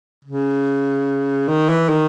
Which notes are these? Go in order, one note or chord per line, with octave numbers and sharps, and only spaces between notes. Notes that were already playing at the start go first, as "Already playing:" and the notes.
C#3
D#3
E3
D#3